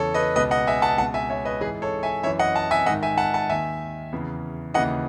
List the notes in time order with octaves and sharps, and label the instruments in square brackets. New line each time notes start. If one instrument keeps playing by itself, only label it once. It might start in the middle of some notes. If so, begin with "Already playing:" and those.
Already playing: [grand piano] E2 C#3 E3 A4 C#5
B4 D#5
C#2 B2 B4 D#5
D#5 F#5
E5 G#5
F#5 A5
C#2 F#5 A5
B2
E5 G#5
C#5 E5
B4 D#5
E3 G#4 B4
G#2
A4 C#5
E5 G#5
F#2 C#5 E5
E3
D#5 F#5
F#5 A5
E5 G#5
G#2 D#3 D#5 F#5
E5 G#5
F#5 A5
F#5 A5
D#2 D#3 E5 G#5
E2 C#3 E3
D#2 C#3 E3 D#5 F#5